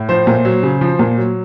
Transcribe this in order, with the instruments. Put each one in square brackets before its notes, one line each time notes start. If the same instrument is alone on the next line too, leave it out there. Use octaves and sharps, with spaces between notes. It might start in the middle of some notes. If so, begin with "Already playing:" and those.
Already playing: [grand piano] A2
F3 C5
A#2
F#3
C#3
F3
A#2
F#3